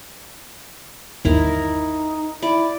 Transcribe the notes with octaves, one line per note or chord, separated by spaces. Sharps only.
G1 D#2 D#4 E4 A#4
E4 D5